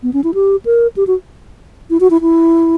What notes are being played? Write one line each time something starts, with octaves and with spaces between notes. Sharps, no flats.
B3
C#4
E4
G4
A#4
G4
F#4
E4
F#4
E4
E4